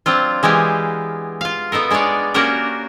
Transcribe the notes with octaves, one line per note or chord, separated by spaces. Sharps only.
F#3 C4 D4 F4
E3 G#3 B3 G4 F5
F4 F5
B3 D#4 A4 A#4
G#3 D4 G#4 C#5 D5
A#3 C#4 D4 F#4 G4 A#4